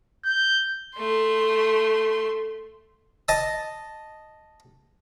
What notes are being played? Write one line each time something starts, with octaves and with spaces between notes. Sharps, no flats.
G6
A3 C6
D#5 A5 D#6